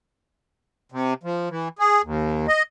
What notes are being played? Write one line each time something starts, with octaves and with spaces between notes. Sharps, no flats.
C3
F3
E3
G#4
D#2
D#5